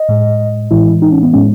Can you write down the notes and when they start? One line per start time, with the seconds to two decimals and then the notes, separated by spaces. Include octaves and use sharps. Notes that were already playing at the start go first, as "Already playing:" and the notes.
Already playing: D#5
0.09 A2 G#3
0.71 A2 E3 G#3 E4
1.02 D#4
1.12 C#4
1.23 B3
1.33 A2 G#3 C#4